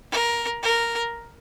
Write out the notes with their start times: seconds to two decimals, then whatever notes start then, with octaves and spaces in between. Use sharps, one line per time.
0.12 A#4
0.62 A#4